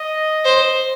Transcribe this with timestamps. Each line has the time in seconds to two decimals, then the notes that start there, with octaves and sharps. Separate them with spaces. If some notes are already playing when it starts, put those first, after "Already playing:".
Already playing: D#5
0.44 C5